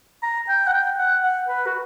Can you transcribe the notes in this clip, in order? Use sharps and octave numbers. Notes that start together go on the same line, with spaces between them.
A#5
G5
F#5
G5
F#5
F#5
B4
F#4